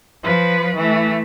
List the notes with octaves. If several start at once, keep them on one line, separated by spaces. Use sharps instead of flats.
F3 B4
E3 A3